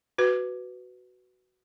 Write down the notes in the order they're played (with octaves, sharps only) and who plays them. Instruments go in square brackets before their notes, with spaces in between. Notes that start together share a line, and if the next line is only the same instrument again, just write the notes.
[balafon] F#4 B4